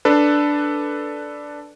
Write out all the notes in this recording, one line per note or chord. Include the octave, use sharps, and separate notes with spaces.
D4 A4 B4